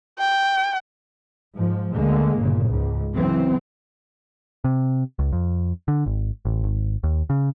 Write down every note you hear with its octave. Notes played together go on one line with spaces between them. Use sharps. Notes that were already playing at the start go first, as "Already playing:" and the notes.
G5
G#2 F3
D2 D3 G#3 A#3
G1 A#2 C#3
C#2 G#2
C#3 E3 F#3 C4
C3
C#2
F2
D3
G#1
A1
G#1
D#2
C#3